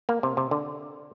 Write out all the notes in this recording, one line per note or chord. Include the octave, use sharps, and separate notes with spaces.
A#3
C3
C3
D3